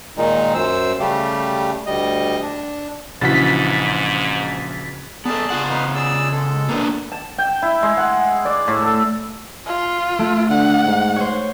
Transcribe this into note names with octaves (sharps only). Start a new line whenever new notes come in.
A#2 D#3 G#3 D#4
F#2 C5 E6
C#3 G3 A3 G4
D2 G3 D#5
D4
A#1 G#2 C#3 E3 F#4 A6 B6
B3 G#4 A4 D5 A5
C#3 F4 F#5
D#4 B4 F5
G#4 D5 E6
G#3 A4
A#3 B3 D4
A5
G5
E4
G#3
F#5
D5
A2
A4
F4
A3
D3 F#5
G#2
C5 C#5